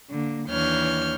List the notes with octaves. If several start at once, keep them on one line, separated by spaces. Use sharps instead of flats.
D3 A#3
D#2 E3 D4 C#5 F6 G6